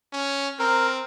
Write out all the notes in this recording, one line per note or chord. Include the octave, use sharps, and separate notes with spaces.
C#4
C4 A#4